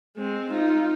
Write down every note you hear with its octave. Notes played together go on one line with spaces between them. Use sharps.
G#3 C4
D#4 F4